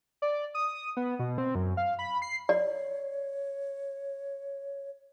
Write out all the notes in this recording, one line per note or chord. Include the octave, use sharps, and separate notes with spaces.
D5
D#6
B3
B2
C4
F#2
F5
B5
C7
C#5 D5